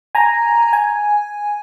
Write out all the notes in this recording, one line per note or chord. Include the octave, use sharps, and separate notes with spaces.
G#5 A#5
G#5